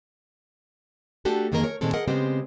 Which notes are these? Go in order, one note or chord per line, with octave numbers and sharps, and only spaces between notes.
A3 D4 F#4 G4 A4
F2 D#3 A#3 G#4 A#4 D#5
A#4 C#5
A#2 D#3 G#3 C4 A4
G#4 A#4 D#5 F#5
C#3 G#3 B3 C4 G4 C5